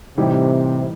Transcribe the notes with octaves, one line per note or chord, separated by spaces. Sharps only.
A2 C3 E3 G3 D#4 G4